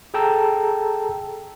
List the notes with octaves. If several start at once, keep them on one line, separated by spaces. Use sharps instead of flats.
G#4 A4 G5 A5 A#5 E6